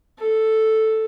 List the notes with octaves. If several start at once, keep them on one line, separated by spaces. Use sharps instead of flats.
A4